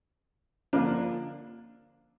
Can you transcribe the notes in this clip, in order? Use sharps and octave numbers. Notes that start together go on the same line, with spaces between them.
D3 F3 A#3 D4 F4